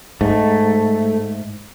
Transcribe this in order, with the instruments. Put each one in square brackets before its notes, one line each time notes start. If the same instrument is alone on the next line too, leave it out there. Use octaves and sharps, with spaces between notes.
[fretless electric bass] G#2 [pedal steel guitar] A3